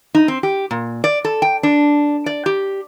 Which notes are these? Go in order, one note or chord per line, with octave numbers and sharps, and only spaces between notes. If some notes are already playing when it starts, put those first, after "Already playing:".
D#4
C4
G4
A#2
D5
A4
G5
D4
D5
G4